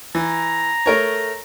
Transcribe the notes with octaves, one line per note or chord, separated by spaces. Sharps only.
E3 A#5
A3 A#4 C#5